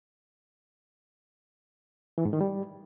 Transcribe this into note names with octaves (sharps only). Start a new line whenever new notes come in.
E3
G#2
D#3
G3